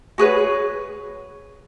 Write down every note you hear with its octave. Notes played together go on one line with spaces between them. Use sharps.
F#4 G#4 B4 C#5